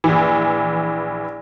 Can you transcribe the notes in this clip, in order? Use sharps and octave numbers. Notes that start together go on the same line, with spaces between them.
A#1 E3